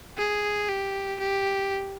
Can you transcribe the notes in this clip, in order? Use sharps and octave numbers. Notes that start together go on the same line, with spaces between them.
G#4
G4
G4